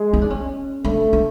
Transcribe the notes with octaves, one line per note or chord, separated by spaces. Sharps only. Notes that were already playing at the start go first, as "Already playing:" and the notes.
Already playing: G#3
D#4
D4
C#4
A3 D4
D4